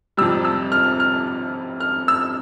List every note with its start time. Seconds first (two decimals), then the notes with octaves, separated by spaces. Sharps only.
0.17 F2 C3 G3 E6
0.45 E6
0.72 F6
1.00 F6
1.80 F6
2.08 E6